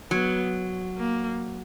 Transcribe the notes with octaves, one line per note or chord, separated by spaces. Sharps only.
F#3 B3
A#3